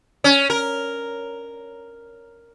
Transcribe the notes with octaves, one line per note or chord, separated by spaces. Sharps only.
C#4
A#4